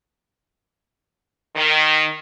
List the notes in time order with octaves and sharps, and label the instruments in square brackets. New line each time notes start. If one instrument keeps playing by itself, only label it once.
[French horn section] D#3